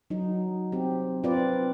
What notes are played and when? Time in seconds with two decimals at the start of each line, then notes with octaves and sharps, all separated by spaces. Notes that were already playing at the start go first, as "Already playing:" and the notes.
0.10 F#3 D#4
0.72 C4 G4
1.23 C4 F4 B4 D5